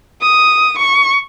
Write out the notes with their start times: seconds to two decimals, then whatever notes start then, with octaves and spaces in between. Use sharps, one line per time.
0.21 D#6
0.78 C#6